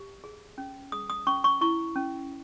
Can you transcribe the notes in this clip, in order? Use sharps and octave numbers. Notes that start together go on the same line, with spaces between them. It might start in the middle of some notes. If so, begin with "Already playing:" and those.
Already playing: G4
G#4
C#4
G#4 D#6
D#6
C#4 C#6
C#6
E4 C#6
C#4